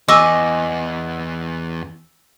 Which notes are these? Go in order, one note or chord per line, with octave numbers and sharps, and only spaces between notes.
E2 D#5 G#5 C#6 D6 E6